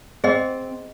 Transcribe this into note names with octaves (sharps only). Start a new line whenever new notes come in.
C4 G#4 D#5 F#5